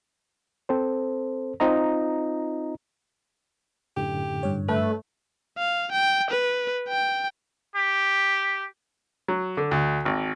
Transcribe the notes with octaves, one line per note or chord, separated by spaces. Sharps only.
C4 A4 C5
C4 D#4 F4 D#5 A#5
F#2 A2 D3 G4
G2 C#5
A3 B4
F5
G5
B4
G5
G4
F#3
D3
D2
G#1